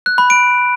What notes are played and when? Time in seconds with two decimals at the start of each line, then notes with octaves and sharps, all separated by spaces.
0.06 F#6
0.18 B5
0.30 D7